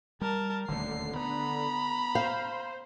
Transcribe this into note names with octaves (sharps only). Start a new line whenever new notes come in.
G3 A#4 A5
D#1 D2 D3 A3 C7
B3 A#5 B5
C5 F5